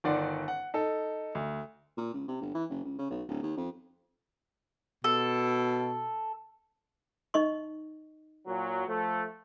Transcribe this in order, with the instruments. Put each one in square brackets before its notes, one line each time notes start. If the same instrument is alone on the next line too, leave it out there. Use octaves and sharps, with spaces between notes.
[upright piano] G1 D#3 D5 F#5 C6
F#5
D#4 A4
D2
[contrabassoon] A#2
C#2
C3
G1
E3
F#1
C#2
C#3
B1
D1
D#2
F2
[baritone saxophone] B2 [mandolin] A4
[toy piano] D#4 D#5 C#6
[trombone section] A#2 F#3
F3 A3